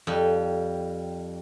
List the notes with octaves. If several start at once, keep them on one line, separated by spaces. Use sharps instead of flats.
F2 G3